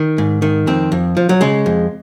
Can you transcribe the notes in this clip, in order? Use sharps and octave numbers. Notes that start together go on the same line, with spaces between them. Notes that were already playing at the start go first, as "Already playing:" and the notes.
Already playing: D#3
G#2
D#3
F2 C4
F2
F3
F#3
C#3 G#3
F2